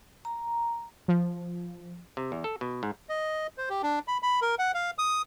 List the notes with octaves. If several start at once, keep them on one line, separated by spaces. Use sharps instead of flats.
A#5
F3
C3
E2
A4
B2
G#2
D#5
C5
G4
D4
B5
B5
A#4
F#5
F5
D#6